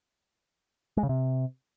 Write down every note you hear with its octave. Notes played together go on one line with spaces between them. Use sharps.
G#3
C#3
C3